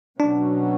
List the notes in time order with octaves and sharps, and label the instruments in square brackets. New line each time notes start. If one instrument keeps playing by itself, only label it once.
[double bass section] B2 F#3 C#4 [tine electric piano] D4